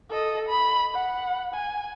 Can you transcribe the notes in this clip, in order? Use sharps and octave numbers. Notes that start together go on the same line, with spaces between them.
A4 D#5
B5
F#5
G#5